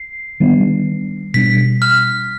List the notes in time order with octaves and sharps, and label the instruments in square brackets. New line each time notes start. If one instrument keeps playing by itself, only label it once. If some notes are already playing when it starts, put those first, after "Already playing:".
Already playing: [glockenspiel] C7
[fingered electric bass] D#3 G3 B3 D4
[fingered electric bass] B2 G3 D4 [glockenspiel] B6
[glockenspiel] F6